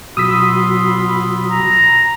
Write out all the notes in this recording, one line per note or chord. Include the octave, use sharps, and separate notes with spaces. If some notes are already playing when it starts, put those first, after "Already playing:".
B2 F#3 F4 F#4 B5 D#6 E6 B6
A#5